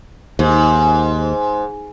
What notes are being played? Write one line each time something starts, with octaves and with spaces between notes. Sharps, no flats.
D#2 G#2